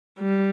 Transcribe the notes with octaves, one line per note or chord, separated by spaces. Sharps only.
G3